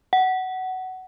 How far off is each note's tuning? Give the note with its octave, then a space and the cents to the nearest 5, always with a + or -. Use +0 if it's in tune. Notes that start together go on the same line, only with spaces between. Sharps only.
F#5 +15